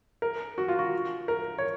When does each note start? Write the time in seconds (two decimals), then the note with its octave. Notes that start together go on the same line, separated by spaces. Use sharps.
0.22 A#4
0.58 F#4
0.68 F4
0.79 F#4
1.28 A#4
1.58 C#5